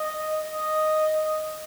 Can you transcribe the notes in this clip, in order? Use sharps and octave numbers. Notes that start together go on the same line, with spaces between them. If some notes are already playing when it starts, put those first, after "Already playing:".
Already playing: D#5
D#5